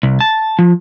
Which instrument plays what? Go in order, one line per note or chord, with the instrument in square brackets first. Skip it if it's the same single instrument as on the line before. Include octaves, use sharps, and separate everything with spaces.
[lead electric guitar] C2
A5
F3